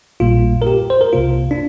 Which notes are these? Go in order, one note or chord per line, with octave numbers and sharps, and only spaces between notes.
A#1 A#2 G3 A#3 F4
A#4
G4
C5
A#4
C2 C3 A#3 F4
D4